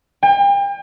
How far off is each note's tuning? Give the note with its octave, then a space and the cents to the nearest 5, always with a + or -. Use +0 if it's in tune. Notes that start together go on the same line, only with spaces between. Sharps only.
G5 +40